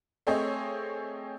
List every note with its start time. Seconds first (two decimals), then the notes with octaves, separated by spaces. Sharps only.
0.27 A3 C4 G#4 C#5 D#5